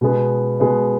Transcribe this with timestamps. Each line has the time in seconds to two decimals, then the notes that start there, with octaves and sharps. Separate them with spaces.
0.01 B2 G#3 B3
0.60 B2 G#3 B3